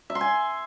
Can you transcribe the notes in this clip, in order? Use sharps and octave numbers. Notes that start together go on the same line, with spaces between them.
E5
C6
G#5